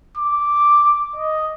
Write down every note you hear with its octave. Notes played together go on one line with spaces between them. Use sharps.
D6
D#5